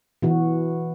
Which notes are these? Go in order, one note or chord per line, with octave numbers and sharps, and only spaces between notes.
B2 E3 F#4